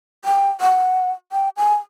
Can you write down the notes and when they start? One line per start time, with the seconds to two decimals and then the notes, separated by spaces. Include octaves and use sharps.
0.25 G5
0.61 F#5
1.32 G5
1.57 G#5